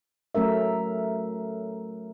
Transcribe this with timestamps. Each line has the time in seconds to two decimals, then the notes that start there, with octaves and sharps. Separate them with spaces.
0.35 F#3 A3 C#4 A#4 E5